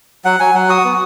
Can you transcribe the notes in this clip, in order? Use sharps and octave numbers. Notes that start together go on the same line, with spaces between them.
F#3 F#5
F#3 G#5
F#3 F#5
F#4 D#6
B3